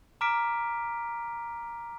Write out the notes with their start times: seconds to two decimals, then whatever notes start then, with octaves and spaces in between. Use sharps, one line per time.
0.21 A#5 D6 F6 B6 D7